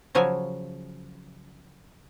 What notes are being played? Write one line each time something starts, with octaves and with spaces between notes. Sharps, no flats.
C#3 F3 F#3 G#5